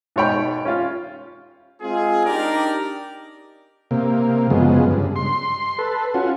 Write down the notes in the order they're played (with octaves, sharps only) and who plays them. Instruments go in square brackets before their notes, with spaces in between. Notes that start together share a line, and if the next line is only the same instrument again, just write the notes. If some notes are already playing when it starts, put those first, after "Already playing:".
[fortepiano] G#2 B2 C#5 G5 B5
C#4 F4
[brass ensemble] G#3 C4 F4 G#4
D4 D#4 G4 A#4 D5
[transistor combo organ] C3 A#3
F#2 C#3 F3 G#3 B3
G2 C#3
C6
A4 B4
C#4 F4 F#4